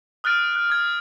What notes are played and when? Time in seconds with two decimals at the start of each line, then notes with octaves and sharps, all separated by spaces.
0.24 D#6 F6 F#6 A6 D7
0.56 F#6
0.70 D#6 G#6